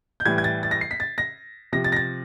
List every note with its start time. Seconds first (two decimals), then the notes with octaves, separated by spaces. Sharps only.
0.20 G6
0.25 A2 E3 G3 G#6
0.38 G#6
0.44 A6
0.63 A6
0.71 A#6
0.81 C7
0.91 B6
1.00 A6
1.18 A#6
1.73 C3 F3 A#6
1.84 A6
1.92 A#6
1.96 A6